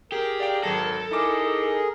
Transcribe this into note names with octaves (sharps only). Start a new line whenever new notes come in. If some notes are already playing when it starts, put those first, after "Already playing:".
G4 G#4 A#4
D5 F5 G5
G#1 F#3 A4 A#6
D#4 E4 G#4 A#4 D6